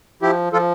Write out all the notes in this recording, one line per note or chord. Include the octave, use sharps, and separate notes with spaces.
F3 E4 G4
F3 F4 A4